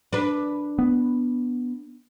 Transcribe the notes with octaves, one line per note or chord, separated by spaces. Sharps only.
D4 B4
B3